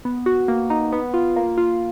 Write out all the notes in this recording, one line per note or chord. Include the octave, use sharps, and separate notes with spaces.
B3
F#4
A#3
D#4
B3
F4
A#3
F4